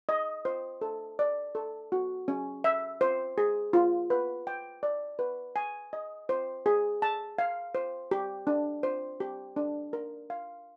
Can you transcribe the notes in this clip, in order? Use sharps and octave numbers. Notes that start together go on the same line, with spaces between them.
D#5
C5
A4
D5
A4
F#4
C#4
E5
C5
G#4
F4
B4
G5
D5
B4
G#5
D#5
C5
G#4
A5
F5
C5
G4
D4
C5
G4
D4
A#4
F5